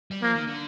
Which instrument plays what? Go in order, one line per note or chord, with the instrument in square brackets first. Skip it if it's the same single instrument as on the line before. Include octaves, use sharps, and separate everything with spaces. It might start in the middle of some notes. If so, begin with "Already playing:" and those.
[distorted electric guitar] G3
[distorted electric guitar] F3 [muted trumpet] A#3
[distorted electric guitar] D#3
D3